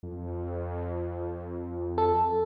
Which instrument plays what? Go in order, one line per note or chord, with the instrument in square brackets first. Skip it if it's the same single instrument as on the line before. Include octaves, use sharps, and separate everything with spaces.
[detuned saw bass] F2
[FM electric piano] A4